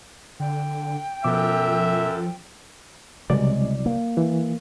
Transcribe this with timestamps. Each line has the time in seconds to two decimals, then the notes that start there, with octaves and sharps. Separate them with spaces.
0.40 D3 G5
1.24 F#2 B2 F3 A4 E5 D6
3.30 C2 C#3 F#3 G#3 D5
3.86 A#3
4.17 E3